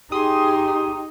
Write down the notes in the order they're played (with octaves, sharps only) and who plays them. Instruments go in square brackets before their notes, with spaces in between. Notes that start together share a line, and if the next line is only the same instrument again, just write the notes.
[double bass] D#4 [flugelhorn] G4 [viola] G#4 C6 [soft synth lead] D#6